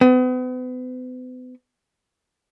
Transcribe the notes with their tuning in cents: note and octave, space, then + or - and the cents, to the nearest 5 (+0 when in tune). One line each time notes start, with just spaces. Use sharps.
B3 +40